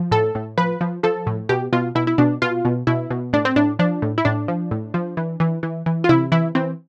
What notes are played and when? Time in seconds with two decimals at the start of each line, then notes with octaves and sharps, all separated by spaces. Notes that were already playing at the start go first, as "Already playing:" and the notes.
Already playing: F3
0.12 A2 A4
0.35 A2
0.58 F3 B4
0.81 F3
1.03 F3 A4
1.27 A2
1.49 B2 G4
1.73 B2 F4
1.95 B2 E4
2.07 E4
2.18 B2 D4
2.42 B2 F4
2.65 B2
2.87 B2 E4
3.10 B2
3.33 A2 D4
3.45 C4
3.56 A2 D4
3.79 F3 D4
4.02 A2
4.18 E4
4.25 A2 D4
4.48 F3
4.71 A2
4.94 F3
5.17 E3
5.40 E3
5.63 E3
5.86 E3
6.04 F4
6.09 C3 E4
6.32 E3 E4
6.55 E3 C4